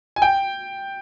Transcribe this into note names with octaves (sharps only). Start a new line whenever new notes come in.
G#5
G5